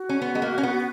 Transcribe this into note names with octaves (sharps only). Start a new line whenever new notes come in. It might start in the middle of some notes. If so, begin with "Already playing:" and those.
Already playing: F#4
C#4
B3
G#3
A#3
C#4
B3